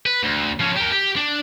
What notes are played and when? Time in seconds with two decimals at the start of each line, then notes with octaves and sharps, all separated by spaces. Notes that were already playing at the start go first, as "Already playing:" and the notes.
0.06 B4
0.23 D2
0.60 F3 C#4
0.76 G4 A#4
0.91 G4
1.16 D4